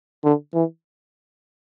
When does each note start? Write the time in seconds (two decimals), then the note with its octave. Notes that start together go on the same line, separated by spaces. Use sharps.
0.24 D3
0.54 E3